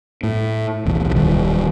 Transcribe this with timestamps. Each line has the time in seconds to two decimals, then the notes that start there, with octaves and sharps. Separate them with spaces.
0.23 A2
0.86 B1 E2
1.15 D1 D#3 G3